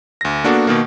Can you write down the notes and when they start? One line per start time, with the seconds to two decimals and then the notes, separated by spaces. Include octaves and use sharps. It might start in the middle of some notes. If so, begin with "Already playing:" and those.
0.21 D2 A#6
0.44 A#3 B3 D4 F#4 A4
0.67 B2 D#3 A#3